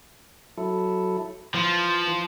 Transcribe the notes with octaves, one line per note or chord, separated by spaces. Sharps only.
F#3 E4 A4
E3 F3 F#6